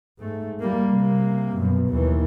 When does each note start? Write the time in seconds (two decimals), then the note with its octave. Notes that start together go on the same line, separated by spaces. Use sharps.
0.19 G#2 A3
0.60 G3 A#3
0.93 C3 A#3
1.57 F#2 B2
1.89 D#2 E3